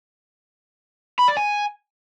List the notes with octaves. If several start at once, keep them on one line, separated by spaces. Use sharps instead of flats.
B5
D5
G#5